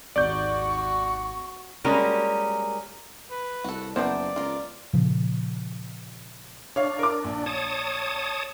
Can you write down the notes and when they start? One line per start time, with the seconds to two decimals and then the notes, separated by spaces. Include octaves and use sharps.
0.16 G#1 D#2 F#4 D5 C#6 G6
1.84 G3 G#3 A#3 C#4 F#4 A#4
3.31 B4
3.64 C2 F#4 A4
3.96 F#1 F3 B3 E4 A#4 C5 D5
4.36 C#2 F4 A#4
4.94 A#2 C#3 F3
6.76 D4 C#5 F5
6.99 A#4 D6
7.24 A#1
7.46 C#5 A5 D#6